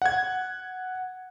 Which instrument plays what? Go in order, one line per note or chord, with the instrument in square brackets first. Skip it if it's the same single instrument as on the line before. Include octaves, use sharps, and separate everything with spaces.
[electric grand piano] F#5 G#6